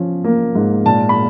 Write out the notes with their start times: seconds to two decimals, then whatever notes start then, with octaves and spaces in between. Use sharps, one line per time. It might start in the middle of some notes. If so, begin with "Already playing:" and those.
Already playing: F3 C#4
0.24 A#3
0.55 G#2
0.86 A#2 A5
1.09 B5